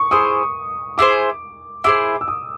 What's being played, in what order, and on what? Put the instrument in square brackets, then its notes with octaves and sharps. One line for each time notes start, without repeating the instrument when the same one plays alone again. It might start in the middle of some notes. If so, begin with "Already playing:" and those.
Already playing: [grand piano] C#6 D#6
[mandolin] E4 G#4 C5 [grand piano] D#6
[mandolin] E4 G#4 C5 [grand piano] D6
[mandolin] E4 G#4 C5 [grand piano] D6
[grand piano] E6
D#6